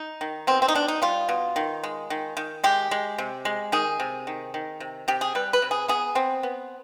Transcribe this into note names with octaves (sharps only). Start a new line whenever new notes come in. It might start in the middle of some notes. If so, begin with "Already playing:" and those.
Already playing: D#4
D#3
B2 C4
C4
D#4
B2 D4
D#4
G3 F4
B2
D#3
G#3
D#3
D#3
G#3 G4
G#3
C3
G#3
D#3 G#4
C3
D#3
D#3
C3
C3 G4
G#4
G3 B4
B4
C3
G#4
B3 G#4
B3 C4
B3